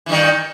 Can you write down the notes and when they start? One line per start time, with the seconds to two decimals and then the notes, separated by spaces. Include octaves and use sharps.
0.06 E3
0.09 G2
0.12 D#3